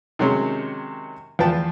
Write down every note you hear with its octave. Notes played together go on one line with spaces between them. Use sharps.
C3 D#3 F#3 G#3 C#4
E2 F3 B4 G5 A5